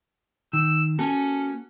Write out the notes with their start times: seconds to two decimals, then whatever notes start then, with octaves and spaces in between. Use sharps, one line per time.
0.53 D#3 E6
0.99 A#3 C#4 F#4 A4